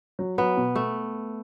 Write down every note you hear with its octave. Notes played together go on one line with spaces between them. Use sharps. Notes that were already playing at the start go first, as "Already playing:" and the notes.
F#3
F#3 B3
B2
A3